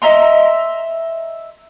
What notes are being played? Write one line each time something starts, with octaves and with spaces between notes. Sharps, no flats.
D#5 E5 A#5 C6